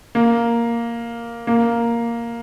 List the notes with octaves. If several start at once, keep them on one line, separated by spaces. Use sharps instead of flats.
A#3
A#3